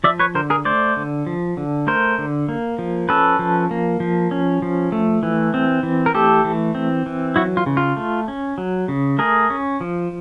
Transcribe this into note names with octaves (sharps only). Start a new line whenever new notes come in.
F3 D5 E5
B4 C#5
D3 A#4 C5
G#4 A#4
A3 C5 D5
D3
F3
D3
A3 A#4 C5
D3
A#3
F3
C#4 A4 B4
F3
A#3
F3
C#4
F3
A3
E3
C4
E3
A#4
A3 G4 A4
E3
C4
E3
F#3 E4 F#4
F4
C#3
F4
A3
C#4
F#3
C#3
A3 G#4 A#4
C#4
F3